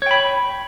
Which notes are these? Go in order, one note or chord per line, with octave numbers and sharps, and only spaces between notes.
C#5 G5 B5